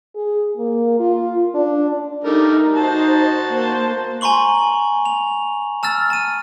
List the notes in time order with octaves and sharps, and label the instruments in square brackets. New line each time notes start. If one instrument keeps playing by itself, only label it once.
[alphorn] G#4
A#3
F4
D4
[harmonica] G3 A3 A#4 [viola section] D#4
[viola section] D#4 C5 [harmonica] F#4 A5
[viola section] A#3 C5
[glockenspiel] G#5 A#5 C6 C#6 F#7
F7
A5 E6 F6 A6
A5 D#7